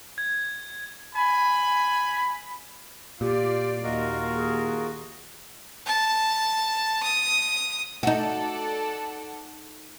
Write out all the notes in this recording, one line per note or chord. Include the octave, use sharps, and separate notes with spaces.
G#6
G#5 B5
A#2 F4 G4 D5
D#2 F4 F#4 A#4 D#5
G#4
A5
D#6
D#4 F#4 A4 D5 F#5